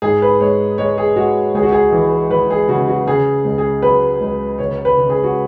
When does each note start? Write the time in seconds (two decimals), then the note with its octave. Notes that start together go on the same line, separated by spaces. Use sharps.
0.02 G#2 G#4
0.22 B4
0.41 G#3 C#5
0.78 G#3 C#5
0.98 G#4
1.16 G#3 F#4
1.54 C#2 G#4
1.63 F#4
1.73 G#4
1.92 E3
2.31 E3 B4
2.50 G#4
2.69 C#3 F#4
2.88 F#4
3.07 C#3 G#4
3.45 C#2
3.58 G#4
3.82 F#3 B4
4.21 C#2
4.59 C#3 C#5
4.85 B4
4.97 C#3
5.09 G#4
5.24 F#4